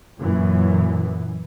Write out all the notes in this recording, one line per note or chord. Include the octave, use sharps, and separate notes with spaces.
F#2 A#2 E3